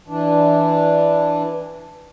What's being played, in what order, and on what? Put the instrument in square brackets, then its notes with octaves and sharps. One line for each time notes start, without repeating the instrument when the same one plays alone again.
[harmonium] E3 D4